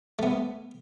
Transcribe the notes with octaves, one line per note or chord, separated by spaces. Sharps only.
A3 B3